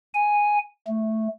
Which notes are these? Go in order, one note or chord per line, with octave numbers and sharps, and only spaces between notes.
G#5
A3